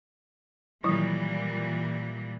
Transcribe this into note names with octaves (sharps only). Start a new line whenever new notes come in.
A#2 D#3 E3 F#3 G3 E4